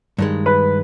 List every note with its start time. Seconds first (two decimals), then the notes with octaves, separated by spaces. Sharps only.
0.18 G2 D#3 G#3
0.46 B4